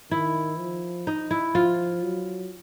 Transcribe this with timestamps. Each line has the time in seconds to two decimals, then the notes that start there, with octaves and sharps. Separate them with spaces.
0.11 D#3 E4
0.59 F3
1.07 D#4
1.31 E4
1.55 F3 F4
2.03 F#3